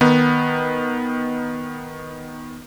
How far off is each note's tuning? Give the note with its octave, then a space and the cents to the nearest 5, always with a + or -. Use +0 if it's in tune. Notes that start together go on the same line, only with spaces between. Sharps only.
D#3 +0 B3 -10 D#4 +0